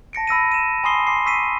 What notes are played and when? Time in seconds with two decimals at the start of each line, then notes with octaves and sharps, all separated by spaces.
0.13 A5 A#6 C#7 D7
0.27 B5 E6 A#6 D#7
0.52 D#7 E7
0.84 G#5 B5 C6 D#6 C7 G7
1.07 C6 D6 C7
1.26 C#6 E6 B6 C7 D#7